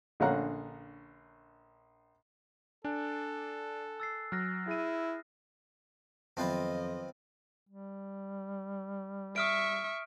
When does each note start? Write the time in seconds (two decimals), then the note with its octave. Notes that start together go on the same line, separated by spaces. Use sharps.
0.20 A#1 D3 C#4 F5 F#5 A#5
2.84 D4 A4 G#5 F#6
4.00 E6 A6 C7
4.32 F#3 F6 F#6 A#6
4.68 E4 G#4 D#7
6.37 F2 D#3 F#3 B3 C4 F4 B4 D#5
7.69 G3
9.36 E5 C#6 D#6 F6 D7